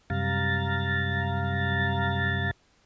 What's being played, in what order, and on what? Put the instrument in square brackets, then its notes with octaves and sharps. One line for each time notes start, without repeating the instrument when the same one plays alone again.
[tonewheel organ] F#2 C3 G3 F5 A#5 A6